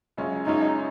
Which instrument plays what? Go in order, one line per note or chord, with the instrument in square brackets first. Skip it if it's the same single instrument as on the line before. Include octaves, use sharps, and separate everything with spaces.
[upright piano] F#2 C#3 G#3 C#4 F4
[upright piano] F#2 C#3 G#3 C#4 F4 [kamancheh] D#4